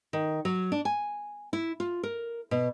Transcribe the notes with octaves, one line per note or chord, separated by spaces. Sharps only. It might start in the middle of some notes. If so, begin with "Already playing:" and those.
D#3
F#3
D4
G#5
E4
F4
A#4
B2